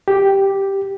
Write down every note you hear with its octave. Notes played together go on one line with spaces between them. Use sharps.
G4